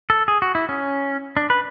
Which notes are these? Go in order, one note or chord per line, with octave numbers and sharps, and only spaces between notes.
A4
G#4
F#4
E4
C#4
D4
B4